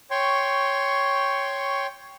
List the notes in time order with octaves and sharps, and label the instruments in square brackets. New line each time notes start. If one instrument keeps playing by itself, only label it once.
[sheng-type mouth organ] C#5 G5 C6 C#6